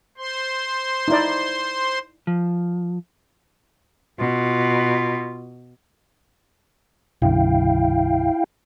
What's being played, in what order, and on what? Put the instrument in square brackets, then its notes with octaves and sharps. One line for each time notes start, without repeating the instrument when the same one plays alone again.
[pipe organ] C5 C6
[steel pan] D#4 E4 D5
[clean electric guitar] F3
[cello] B2 [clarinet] F4
[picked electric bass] B1 F#2 D3 [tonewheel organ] E4 F5 G5